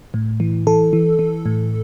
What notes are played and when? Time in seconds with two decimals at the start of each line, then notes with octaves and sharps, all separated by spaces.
0.14 A2
0.40 E3
0.67 E3 A4
0.93 E3
1.19 E3
1.46 A2